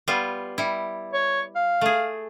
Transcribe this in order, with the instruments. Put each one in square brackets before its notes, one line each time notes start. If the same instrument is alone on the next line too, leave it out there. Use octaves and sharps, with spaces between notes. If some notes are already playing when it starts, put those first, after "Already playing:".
[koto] G3 B3 F4
G3 E4
[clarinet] C#5
F5
[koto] A3 G#4